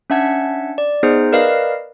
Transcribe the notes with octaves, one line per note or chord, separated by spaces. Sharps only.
C#4 D4 E5 F#5 A5 G#6
D5
B3 D#4 G#4 C5 D#5
A#4 B4 D5 D#5 F5